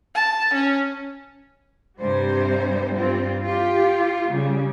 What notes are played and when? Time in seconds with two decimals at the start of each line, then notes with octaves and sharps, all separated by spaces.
0.15 A5
0.54 C#4
1.99 G2 C3 G3 C5
2.94 G2 C4 F4
3.43 F4 G4
4.28 C#3 G3